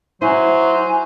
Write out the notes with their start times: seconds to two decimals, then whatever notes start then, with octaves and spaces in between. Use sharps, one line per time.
0.22 F#3 E4 C5 G#5